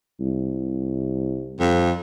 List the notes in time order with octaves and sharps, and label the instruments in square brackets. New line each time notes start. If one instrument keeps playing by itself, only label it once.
[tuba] C2
[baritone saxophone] F2